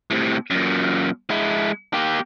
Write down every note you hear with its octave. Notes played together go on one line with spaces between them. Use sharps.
A2 C3
F#2 A#2
G#3 E4
A#3 G4